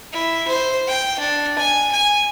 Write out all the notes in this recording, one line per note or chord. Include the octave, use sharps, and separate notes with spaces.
E4
C5
G5
D4
G#5
G#5